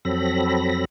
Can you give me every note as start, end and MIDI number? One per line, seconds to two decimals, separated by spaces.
0.05 0.85 41
0.05 0.85 54
0.05 0.85 60
0.05 0.85 69
0.05 0.85 83
0.05 0.85 94